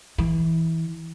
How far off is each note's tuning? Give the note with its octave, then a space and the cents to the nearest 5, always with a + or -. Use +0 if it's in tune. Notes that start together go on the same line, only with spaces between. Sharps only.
E3 -15